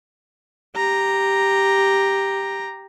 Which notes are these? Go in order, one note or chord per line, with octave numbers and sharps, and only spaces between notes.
G4 A#5